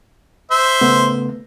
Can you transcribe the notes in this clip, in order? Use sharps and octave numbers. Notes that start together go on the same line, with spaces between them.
C5 E5
C#3 A3 B3